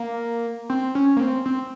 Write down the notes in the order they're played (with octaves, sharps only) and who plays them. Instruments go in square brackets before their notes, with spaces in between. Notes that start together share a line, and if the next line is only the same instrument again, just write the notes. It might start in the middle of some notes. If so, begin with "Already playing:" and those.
Already playing: [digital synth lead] A#3
C4
C#4
A#3
C4
C4